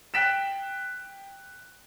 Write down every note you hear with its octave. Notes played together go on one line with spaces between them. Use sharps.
G5 F#6 B6 D7 E7